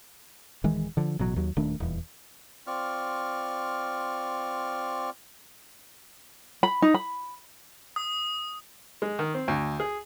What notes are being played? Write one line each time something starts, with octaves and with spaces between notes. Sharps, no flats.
D#1 D#3 E3 G#3
D3 F3
A1 B2 F#3
D#2 F#3
D#1 D#3 A3 D4
D#1 E2
C4 F4 D5 C#6 F6
B5
D#4
B5
D#6
G#3
D#3
C4
D2
G#4